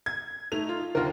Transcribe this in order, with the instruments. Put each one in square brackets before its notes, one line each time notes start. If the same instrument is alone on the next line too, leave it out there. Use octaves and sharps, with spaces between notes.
[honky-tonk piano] G#6
[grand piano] A3 [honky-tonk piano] D#4 F7
[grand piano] F4
[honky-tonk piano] D#2 D3 [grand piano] F4 A#4